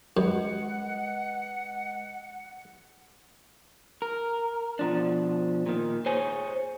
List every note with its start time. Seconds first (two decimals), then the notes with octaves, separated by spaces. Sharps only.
0.17 F#2 G#3 B4 D#5 F#5
4.02 A#4
4.79 B2 F3 D4
5.66 A#2 D#3
6.06 G#4 C5 C#5 G#5